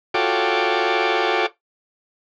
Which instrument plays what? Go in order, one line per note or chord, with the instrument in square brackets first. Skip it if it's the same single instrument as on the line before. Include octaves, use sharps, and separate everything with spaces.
[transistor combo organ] F4 F#4 A4 C#5 G5 D6